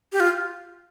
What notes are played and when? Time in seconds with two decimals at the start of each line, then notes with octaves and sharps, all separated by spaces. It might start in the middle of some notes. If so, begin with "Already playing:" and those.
0.13 G4
0.20 F4